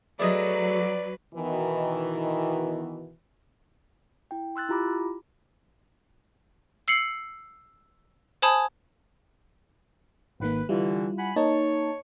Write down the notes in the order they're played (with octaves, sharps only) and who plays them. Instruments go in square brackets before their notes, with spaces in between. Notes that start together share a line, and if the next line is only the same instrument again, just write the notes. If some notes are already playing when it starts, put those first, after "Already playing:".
[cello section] F#3 [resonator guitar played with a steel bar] A3 G#4 D#5 [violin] B4 [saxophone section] D5
[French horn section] B2 D#3 E3
[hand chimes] E4 G5
C6 E6 F#6 A6
E4 F4 G4 A#5 B5 D6
[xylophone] E6 C7 C#7 F#7
C5 G#5 A5 B5 D#6 G#6
[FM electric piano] G#1 D#3 A#3 [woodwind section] B4
[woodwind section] G2 D3 E3 [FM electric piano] G3 E4 F4
[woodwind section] F#5 G#5 B5
[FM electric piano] A#3 D#4 A5 [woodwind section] C#5